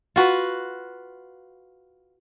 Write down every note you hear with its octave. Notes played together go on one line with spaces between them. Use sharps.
F4 F#4 B4